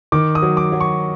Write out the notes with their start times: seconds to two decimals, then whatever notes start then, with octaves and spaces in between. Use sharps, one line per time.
0.12 D#3 D6
0.35 D#6
0.42 F#3
0.57 D6
0.72 F#3
0.81 C#6